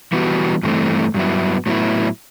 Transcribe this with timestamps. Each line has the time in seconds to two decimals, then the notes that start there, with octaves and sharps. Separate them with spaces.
0.13 E3 G3 B3 F#4
0.63 G2 E3 A3 C4
1.14 G2 F#3 B3 E4
1.66 A2 F#3 B3 E4